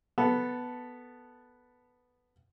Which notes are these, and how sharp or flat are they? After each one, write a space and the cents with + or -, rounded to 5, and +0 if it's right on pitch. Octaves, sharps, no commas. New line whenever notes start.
B3 +0 A4 +0